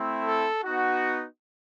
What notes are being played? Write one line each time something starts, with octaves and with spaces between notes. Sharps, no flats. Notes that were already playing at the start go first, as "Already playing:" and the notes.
Already playing: A3 C4 E4
A4
B3 D#4 F#4